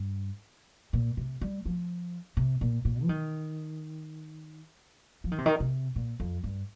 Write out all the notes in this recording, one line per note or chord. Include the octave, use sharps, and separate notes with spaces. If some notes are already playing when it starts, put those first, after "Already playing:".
Already playing: G2
A#2
C3
G3
F3
C3
A#2
A#2
F3
D#3
F3
D#3
C3
D#3
C3
A#2
F2
G2